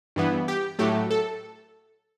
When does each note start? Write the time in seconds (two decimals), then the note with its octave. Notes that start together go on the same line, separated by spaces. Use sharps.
0.16 G2 E3 B3
0.48 G4
0.79 A2 F#3 A3 G4
1.11 A4